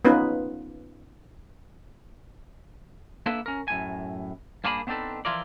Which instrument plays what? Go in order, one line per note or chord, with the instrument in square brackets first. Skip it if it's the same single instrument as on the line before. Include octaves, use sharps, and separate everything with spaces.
[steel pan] B3 C#4 D#4 F4 B4
[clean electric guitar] A#3 B3 D4 E4 A4 B4
C#4 A#4
F#2 A2 G#5
G2 A#3 D4 G#4 A#5 B5
B3 C4 D4 D#4 A4 B4
E3 F3 E4 F4 A#4 D5